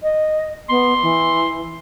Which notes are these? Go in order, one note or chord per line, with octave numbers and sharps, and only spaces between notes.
D#5
B3 C6
E3